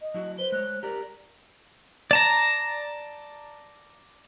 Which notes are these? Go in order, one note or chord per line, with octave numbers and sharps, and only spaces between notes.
D#5
F#3 E4 F#4
B4 C5 G7
G#3 C#5 F#6
G4 A#4 D5 A#5
D5 A5 A#5